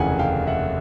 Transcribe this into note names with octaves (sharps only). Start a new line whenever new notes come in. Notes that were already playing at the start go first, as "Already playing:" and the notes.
Already playing: F1 D#2 C#3 E3 F#5 G#5
F5 G5
E5 F#5